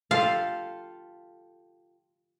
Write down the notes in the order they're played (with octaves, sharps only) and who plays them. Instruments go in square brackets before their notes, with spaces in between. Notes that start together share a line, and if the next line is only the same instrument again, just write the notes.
[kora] F4 G4 A4 [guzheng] F5